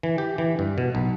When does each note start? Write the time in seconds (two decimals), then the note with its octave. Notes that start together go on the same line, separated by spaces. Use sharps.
0.03 E3
0.18 G4
0.38 E3
0.59 G2
0.78 B2
0.95 B1